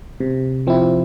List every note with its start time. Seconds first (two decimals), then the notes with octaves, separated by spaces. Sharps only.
0.20 C3
0.67 F3 C4 E4